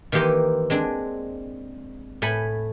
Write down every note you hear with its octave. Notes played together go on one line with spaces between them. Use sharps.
D#3 E3 A#3 G4 C5 D#5
G#3 C4 D4
A2 A3 G#5 B5